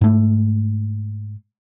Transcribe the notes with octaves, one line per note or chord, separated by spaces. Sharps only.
G#2 A3